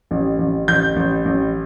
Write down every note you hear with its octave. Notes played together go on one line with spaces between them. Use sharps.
A1
A1
A1 G6
A1
A1